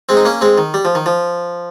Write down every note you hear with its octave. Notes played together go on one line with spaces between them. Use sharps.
G#3 C4
D#4
A#3 C#4
G#3 C4
D#3
G3
F3
D#3
F3